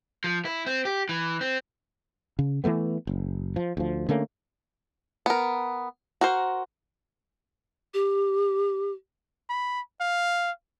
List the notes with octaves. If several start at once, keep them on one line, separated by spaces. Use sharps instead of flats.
F3
E4
C4
G4
E3
C4
C#3
E3 F#3 A3 B3
F#1
F3
D2 F3
D3 A3 A#3 C#4
B3 A#4
F#4 A#4 C5
G4
B5
F5